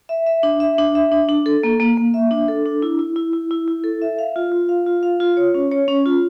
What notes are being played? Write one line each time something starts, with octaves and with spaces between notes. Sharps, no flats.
E5
E5
D4
E5
D4
E5
D4
D4
A4
A#3
A#3
A#3
E5
D4
A4
D4
E4
E4
E4
E4
E4
E4
A4
E5
F5
F4
F4
F5
F4
F5
F4
C#5
C#4
C#5
C#4
F4